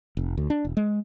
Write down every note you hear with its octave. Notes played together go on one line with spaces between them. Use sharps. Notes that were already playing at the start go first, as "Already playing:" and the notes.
F1
D2
D4
E1
G#3